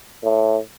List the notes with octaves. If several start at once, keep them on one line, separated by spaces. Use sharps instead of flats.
A2